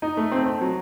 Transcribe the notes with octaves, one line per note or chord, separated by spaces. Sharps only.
D#4
A3
C4
C4
F#3